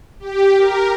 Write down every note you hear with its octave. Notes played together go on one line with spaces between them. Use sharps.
G4
A#4